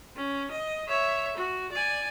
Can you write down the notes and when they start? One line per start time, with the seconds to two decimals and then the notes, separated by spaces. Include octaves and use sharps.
0.16 C#4
0.51 D#5
0.88 C#5 E5
1.37 F#4
1.72 D5 G#5